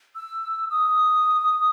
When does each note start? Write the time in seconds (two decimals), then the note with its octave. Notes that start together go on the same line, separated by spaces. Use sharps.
0.16 E6
0.70 D#6